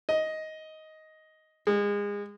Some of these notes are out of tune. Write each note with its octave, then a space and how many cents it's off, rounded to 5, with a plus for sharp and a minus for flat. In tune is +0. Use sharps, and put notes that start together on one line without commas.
D#5 +10
G#3 -30